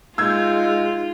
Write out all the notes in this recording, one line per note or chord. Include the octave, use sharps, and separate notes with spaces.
G#3 D#4 F4 E6 G6 G#6